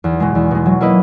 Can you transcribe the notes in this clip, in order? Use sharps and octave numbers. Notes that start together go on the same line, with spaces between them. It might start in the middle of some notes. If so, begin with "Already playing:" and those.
E2
B2 G#3
E2
B2 G#3
F#3
A#3 E4 B4 D#5